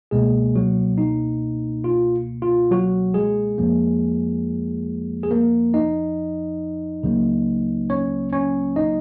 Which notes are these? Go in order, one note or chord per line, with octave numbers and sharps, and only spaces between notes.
C#2 B2 G#3 A#3 G#4
F#3 F#4
D#4
F4
F4
F#3 F#4
G#3 G#4
F2 F3 A#3
G#4
A#3 A#4
D#4 D#5
C#2 C#3 F#3 A#3
C#4 C#5
C#4 C#5
D#4 D#5